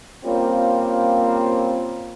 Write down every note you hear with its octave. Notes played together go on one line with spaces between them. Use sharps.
G3 A#3 C4 C#4 F4